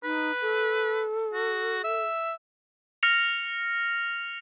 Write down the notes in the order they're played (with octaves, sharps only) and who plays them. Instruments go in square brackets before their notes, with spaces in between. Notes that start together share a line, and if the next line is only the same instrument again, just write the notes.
[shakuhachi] D#4 [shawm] B4
[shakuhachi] A4
[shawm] F#4
E5
[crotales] F6 A#6 C#7 F7